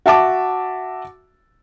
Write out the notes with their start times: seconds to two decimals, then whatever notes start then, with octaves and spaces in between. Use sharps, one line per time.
0.06 F#4 E5 A5 D6